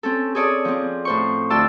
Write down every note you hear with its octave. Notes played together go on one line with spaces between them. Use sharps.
C4 C#4 A4
G#4 A4 C#5 D5 D#6
F3 C4
A2 C5 C#6
D2 F4 D5 G5 A5 E6